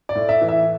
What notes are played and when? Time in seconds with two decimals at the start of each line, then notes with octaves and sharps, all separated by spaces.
0.09 D5
0.15 A2
0.29 E5
0.42 E3
0.49 E5